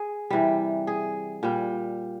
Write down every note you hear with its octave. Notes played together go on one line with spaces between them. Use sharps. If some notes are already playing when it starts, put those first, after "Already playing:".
Already playing: G#4
C3 E3 G3
G#4
A#2 G3